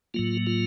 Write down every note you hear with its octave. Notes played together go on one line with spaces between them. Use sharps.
A2 F#3 A#3 F4
F4